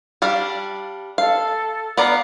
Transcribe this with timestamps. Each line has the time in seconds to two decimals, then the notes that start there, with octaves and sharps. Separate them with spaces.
0.22 G3 D4 F5
1.18 A4 F5
1.97 B3 D5 F5 A#5